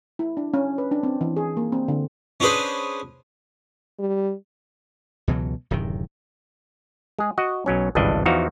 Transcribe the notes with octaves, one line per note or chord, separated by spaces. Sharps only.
E4
D4
C#4
B4
D4
C4
E3
G#4
A#3
C4
D3
C#4 D4 G#4 B4 C5
G3
C#2 B2 E3 F#3
D1 F#2 C3 D#3
G#3 G#4
F#4 D#5 F#5
B1 F#3 C#4
G#1 C#2 G2 E3 D4 D#5
E2 E3 F3 D#4 F#4 F5